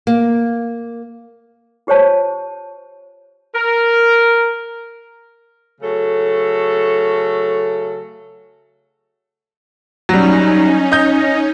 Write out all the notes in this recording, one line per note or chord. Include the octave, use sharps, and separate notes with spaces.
A#3
F4 G4 C5 C#5 A5
A#4
C#3 F#3 A3 A4
F#3 G3 C#4 D#4
D#5 G6